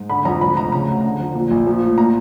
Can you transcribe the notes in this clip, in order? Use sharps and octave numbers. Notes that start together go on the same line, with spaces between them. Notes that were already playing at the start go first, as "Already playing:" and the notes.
Already playing: G#2
D3 B5
F2 A#5
F2 B5
F1 A#5
C#3 A#5
D2
D3
F2
A#2
A#1
F3
A2
A#2 A#5